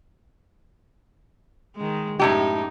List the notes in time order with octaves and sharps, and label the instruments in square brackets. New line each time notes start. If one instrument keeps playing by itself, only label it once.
[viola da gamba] D#3 G#3
[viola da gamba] F#2 D#4 [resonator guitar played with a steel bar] A2 C3 G4